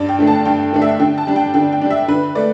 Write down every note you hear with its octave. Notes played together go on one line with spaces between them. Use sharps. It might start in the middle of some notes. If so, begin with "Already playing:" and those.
Already playing: G2 D5
G5
D3 A3 D4
A5
G2 G5
D3 A3 D4
E5
D3 G5
A5
G3 D4
G5
D3 G5
G5
G3 D4
E5
D3 B4
A3 D5